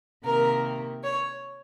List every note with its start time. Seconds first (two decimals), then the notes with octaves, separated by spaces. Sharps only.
0.24 C3 D#3 A#3 A#4
1.03 C#5